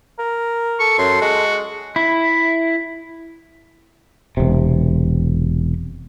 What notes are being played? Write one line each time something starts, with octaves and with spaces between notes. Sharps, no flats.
A#4
A4 C#6
F#2 C6
G#3 F#4
E4
E1 C3